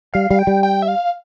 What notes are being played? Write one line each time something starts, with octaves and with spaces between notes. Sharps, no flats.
G3 F5
G3 F5
G5
G3
G5
E5
F5